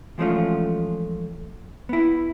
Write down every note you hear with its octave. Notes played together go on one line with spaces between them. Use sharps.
E3 F3 G#3 A3 C#4 F4
B3 E4